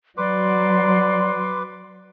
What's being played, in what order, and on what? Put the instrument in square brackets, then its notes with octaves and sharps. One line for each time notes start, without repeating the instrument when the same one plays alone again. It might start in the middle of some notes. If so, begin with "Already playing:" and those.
[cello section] F#3 [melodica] B4 D6 [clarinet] D5 [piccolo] C6